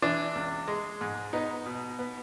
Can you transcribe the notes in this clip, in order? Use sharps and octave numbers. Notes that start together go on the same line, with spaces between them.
E3 D4
C#2
G#3
G#2
B3 D#4
B2
B3